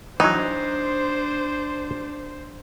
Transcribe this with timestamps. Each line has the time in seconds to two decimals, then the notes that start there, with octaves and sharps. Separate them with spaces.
0.20 E3 F#3 D4 D#4 C5